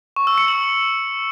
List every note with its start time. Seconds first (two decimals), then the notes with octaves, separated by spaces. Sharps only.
0.16 C#6
0.27 E6
0.38 C#7
0.48 F#7